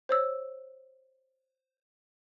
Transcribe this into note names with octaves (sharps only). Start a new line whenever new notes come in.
C5 C#5 E6